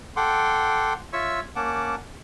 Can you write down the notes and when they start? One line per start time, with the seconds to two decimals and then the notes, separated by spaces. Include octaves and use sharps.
0.16 A4 F#5 G5 C6 D6
1.13 F4 C#5 E5 C#6 E6
1.56 A#3 C#4 F#5 A5 D6